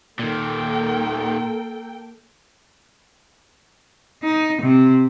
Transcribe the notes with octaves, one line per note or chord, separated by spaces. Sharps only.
A#2 D#3 A#3 A4 G5
D#4
C3